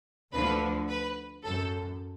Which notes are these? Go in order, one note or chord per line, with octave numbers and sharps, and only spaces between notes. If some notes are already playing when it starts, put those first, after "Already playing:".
D2 D3 F3 B4
B4
F#2 A4